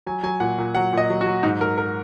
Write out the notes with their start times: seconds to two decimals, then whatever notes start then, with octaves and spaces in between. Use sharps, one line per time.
0.06 F#3 G#5
0.23 F#3 G#5
0.40 A#2 F#5
0.58 A#2
0.75 F#3 F#5
0.93 A#2 D#5
1.10 F#3
1.21 F#4
1.26 F#3
1.43 G#2 D#4
1.61 F#3 A#4
1.78 A#4